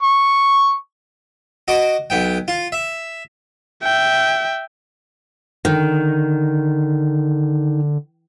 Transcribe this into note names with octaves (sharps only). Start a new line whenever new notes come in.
C#6
F#4 D#5 D6
B1 B3 G5
F4
E5
E5 G5
D3 D#3